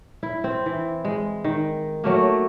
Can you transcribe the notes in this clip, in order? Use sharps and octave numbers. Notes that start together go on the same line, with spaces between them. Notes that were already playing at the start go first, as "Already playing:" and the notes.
E4
C4
E3
G#3
D#3
F#3 A3 A#3